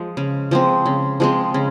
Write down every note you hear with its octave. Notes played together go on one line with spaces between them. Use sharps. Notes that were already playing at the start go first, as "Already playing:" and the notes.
Already playing: F3 G#3
C#3
F3 G#3 C4
C#3
F3 G#3 C4
C#3